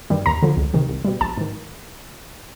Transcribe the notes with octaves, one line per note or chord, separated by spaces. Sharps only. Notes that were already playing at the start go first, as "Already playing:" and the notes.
G2 D#3 G3
D#2 A#5
D3 F3
C#2
C3 D#3
C2
B2 G3
A#1 A5
G#2 D#3